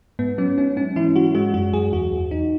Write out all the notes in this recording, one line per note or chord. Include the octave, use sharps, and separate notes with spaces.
G#2 B3
F#3 C#4
G#2 C#4
G#2 C#4
E3 E4
E3 F#4
G#3 F#4
F#2 F#4
F#2 G#4
E2 F#4
E2
E2 D#4